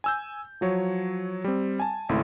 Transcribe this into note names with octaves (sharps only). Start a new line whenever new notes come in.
G#5 E6 G6
F3 F#3 C#5
G3 C4
G#5 A5
G#1 C#2 A3 E4 C6